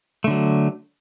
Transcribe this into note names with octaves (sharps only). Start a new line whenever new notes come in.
D3 F#3 A3